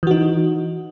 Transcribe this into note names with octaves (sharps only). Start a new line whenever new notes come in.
E3 D#4 F#4